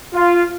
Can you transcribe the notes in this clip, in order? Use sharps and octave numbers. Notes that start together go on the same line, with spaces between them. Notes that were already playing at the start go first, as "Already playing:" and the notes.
F4